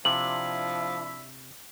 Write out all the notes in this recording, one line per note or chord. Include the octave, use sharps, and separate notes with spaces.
C3 F3 D4 E4 E5 F#7